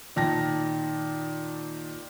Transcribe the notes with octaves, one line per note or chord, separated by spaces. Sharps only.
A#2 D#3 A5 A#6